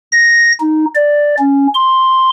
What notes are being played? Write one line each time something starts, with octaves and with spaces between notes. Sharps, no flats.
A#6
D#4
D5
C#4
C6